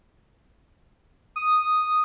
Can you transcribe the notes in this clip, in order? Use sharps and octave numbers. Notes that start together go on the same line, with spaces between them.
D#6